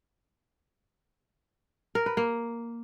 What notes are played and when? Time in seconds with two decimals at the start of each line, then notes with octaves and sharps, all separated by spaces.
1.95 A#4
2.06 B4
2.17 A#3